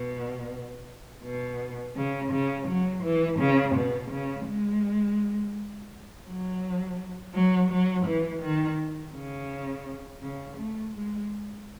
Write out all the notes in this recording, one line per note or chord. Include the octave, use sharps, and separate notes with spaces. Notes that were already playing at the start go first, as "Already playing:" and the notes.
Already playing: B2
B2
C#3
C#3
F#3
E3
C#3
B2
C#3
G#3
F#3
F#3
F#3
E3
D#3
C#3
C#3
A3
G#3